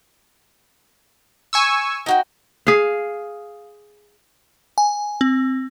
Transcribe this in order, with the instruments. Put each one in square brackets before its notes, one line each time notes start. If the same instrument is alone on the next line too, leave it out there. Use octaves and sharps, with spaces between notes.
[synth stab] G#5 C#6 E6
[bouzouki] D#4 F#4 G5
[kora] G#4 F5
[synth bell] G#5
C4